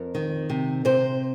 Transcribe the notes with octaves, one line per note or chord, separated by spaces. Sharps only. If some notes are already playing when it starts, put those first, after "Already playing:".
Already playing: F2 A#4
D#3
C3
C3 C5